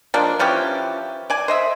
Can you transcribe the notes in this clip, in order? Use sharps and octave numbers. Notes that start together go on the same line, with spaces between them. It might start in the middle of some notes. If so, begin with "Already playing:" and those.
F3 G#3 A#3 D4
E3 F3 C#4 G4
D5 G#5
C5 D#5 E5